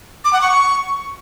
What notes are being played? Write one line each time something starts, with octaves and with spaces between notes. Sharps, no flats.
D6
F#5
C#6